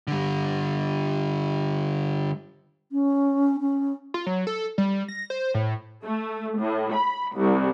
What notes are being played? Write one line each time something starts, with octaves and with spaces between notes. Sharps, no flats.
D3 G3
C#4
C#4
F4
F#3
A4
G3
A#6
C5
A2
A3
A2
B5
C2